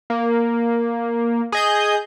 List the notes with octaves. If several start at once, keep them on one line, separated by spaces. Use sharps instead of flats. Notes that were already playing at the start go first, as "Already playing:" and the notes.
A#3
G#4 D#5 G6